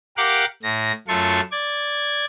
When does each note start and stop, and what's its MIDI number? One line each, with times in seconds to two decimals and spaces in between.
0.17 0.45 67
0.17 0.45 70
0.17 0.45 77
0.17 0.45 78
0.17 0.45 86
0.63 0.92 45
0.63 0.92 94
1.08 1.41 42
1.08 1.41 57
1.08 1.41 65
1.08 1.41 69
1.08 1.41 85
1.52 2.25 74
1.52 2.25 92